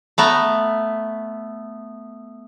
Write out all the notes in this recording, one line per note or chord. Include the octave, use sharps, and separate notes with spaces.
A3 B3 A#5